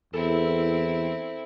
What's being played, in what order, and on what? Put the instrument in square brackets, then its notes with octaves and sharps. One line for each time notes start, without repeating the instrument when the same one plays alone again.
[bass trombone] E2 [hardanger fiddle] C4 E4 [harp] A4